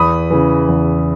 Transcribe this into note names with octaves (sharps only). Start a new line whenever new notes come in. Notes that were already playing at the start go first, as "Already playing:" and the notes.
Already playing: E2 B5 D#6
C#3 E3
E2